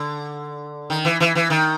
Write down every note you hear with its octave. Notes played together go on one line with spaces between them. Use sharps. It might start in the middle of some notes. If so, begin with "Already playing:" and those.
Already playing: D3
D#3
E3
E3
E3
D#3